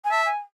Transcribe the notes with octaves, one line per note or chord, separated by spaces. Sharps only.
G#5
E5 A5
G#5